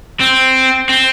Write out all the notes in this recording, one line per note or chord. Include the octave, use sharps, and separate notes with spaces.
C4
C4